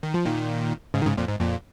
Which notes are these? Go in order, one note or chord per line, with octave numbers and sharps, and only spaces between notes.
D#3
F3
A#2 D#3
G#2 C#3
D#3
G#2 C#3
F2 A#2
G#2
F2 A#2